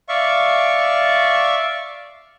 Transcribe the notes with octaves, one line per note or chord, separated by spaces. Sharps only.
D5 E5 F5 C#6